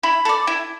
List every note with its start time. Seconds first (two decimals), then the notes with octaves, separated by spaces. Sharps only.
0.03 E4 B5
0.25 A4 D5
0.47 E4